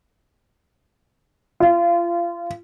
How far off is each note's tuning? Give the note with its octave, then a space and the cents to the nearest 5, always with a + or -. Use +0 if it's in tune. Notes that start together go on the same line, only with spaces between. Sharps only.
F4 -30